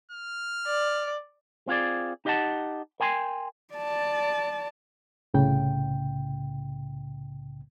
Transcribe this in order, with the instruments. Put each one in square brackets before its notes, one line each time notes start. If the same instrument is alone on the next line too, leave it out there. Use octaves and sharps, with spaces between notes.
[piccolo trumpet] F6
[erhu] D5
[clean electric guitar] C4 F4 G#4 D5
D#4 G4 D#5 F5 F#5 A5
A#4 G5 G#5 B5 C6
[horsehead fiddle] D5 A5
[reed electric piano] C2 A2 C#3 G5